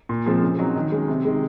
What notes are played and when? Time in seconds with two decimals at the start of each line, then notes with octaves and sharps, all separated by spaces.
0.09 A#2
0.26 F3 G#3 C4
0.43 C#3
0.59 F#3 C4 D#4
0.76 D#3
0.92 G#3 C#4
1.08 C3
1.25 D#3 G#3